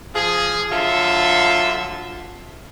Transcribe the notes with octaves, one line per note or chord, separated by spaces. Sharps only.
F3 G#4
D3 F#3 F4 A4 E5